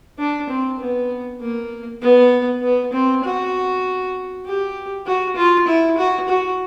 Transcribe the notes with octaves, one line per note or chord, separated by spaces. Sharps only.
D4
C4
B3
A#3
B3
B3
C4
F#4
G4
F#4
F4
E4
F#4
F#4